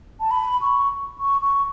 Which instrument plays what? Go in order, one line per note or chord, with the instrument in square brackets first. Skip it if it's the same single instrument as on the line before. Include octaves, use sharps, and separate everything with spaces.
[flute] A5
B5
C#6
C#6
C#6